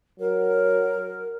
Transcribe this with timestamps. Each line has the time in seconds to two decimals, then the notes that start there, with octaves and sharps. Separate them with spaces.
0.20 F#3 A#4